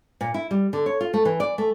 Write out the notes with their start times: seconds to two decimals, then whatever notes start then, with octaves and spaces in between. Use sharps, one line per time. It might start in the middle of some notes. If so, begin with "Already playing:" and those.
0.21 A#2
0.34 E4
0.51 G3
0.73 D3
0.86 C#5
1.01 F4
1.14 A3
1.25 E3
1.40 D5
1.58 A3